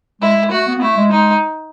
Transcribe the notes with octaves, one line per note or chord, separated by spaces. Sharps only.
G#3 E4
G#3
A3 F#4
B3
B3
A3 E4
G#3
G#3 D#4